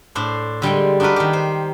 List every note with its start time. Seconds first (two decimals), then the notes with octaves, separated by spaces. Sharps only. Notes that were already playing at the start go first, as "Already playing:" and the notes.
0.15 A2 D4 C5
0.62 D3 G3 G#3 G5
1.00 D4 D#4 F#4 A#4 B4
1.16 D#3 G4
1.33 C5